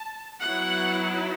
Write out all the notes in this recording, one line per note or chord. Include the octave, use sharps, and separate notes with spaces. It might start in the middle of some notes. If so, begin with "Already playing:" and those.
Already playing: A5
F#3 B3 E4 F#5